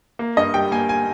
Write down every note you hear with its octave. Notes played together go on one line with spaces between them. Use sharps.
A#3
G2 D#5
G3 G5
A#3 G#5
G#5